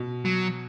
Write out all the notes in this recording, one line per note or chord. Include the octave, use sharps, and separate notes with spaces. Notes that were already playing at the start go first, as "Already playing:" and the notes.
Already playing: B2
F#3